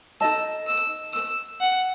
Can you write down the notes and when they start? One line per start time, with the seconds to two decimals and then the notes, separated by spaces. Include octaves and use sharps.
0.21 D#4 A4 D#5 A5 E6
0.67 E6
1.14 E6
1.60 F#5